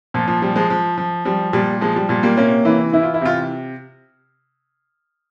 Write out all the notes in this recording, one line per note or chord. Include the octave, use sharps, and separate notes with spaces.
A#2 F3
F3
F3 G3
F3 G#3
F3
F3
F3 G3
A#2 G3
F3 G#3
G3
A#2 G3
G3 A#3
C3 A#3 C#4
E3
E3 E4
F4
E4
C3 F4